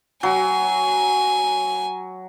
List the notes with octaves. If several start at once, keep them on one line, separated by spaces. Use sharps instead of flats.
F#3 G#5